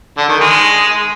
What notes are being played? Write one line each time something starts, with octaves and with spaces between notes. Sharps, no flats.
D3
D#3
G#3